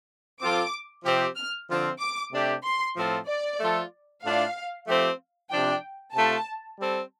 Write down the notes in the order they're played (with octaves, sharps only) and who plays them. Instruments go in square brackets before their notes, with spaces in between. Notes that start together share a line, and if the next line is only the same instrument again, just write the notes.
[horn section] F3 C4 F4 A4 [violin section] D6
[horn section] C3 F3 C4 G4
[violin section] F6
[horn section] D3 F3 C4 F4
[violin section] D6
[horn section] C3 A3 D4 G4
[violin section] C6
[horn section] A2 F3 C4 F4 A4
[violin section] D5
[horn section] F3 A3 F4 A4
[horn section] A2 A3 D4 F4 [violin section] F5
[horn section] F3 A3 C4 G4
[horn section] C3 F3 D4 [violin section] G5
[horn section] C3 A3 F4 [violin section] A5
[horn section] G3 C4 A4